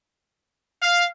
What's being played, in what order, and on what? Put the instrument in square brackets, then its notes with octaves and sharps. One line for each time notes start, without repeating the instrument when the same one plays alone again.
[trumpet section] F5